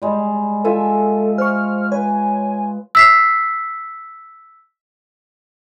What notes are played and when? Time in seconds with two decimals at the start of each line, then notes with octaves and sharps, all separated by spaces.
0.02 G3 G#3
0.64 F4 A4 E5 G#5
1.38 C5 C#6 F6
1.92 B4 C#5 G#5
2.95 E6 B6 C7